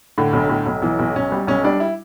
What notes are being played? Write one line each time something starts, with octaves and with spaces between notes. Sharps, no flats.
A2 D3
B1
A2
B1
B1 E3
B1
B1 C#4
G3
B1 C#4
G3 D4
E4